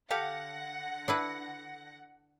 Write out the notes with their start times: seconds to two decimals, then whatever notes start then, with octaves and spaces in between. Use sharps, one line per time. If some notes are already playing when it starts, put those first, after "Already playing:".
0.11 D3 G4 A4 F5 F#5 A#6
1.08 D4 E4 B4